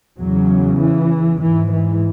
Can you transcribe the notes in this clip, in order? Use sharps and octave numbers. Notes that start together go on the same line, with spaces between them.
E2 C#3 F#3
E3
G#2 E3
E3